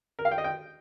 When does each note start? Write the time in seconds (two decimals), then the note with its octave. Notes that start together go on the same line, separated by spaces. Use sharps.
0.19 A#4
0.25 F5
0.31 G5
0.38 D#5
0.44 G5